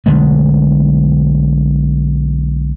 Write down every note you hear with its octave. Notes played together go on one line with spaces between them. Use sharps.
B1 D3 G#3 A3